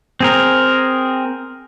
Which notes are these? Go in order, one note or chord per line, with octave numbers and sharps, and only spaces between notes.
C4 G#4 A#4